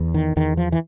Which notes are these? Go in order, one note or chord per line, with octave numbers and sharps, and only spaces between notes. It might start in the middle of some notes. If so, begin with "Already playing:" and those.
Already playing: E2
D#3
E2 D#3
F3
E3